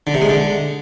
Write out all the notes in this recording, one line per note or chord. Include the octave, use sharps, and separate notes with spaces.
D3
C3
G#3
D3